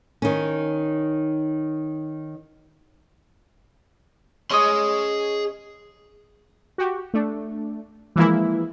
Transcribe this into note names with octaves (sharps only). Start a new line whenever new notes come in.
D#3 C#4
C#4 G#4 C#5 D#5 C6
F#4 G4
A3 D4
E3 F3 G#3 A#3 E4